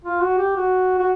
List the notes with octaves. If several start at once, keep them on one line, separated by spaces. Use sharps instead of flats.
F4
F#4
G4
F#4
F#4